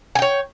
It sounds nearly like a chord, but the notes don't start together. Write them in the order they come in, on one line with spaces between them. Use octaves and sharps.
G#5 G5 C#5